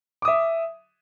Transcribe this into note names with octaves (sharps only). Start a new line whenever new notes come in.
E5 D6 D#6